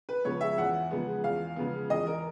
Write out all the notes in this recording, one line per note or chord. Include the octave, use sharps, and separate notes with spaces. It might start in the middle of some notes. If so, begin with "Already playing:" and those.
B4
C#3 F3 G#3 B3 C#5
E5
E2 F#5
C#3 F3 G#3 B3
E2 F5
C#3 F3 G#3 B3
E2 D#5
A#4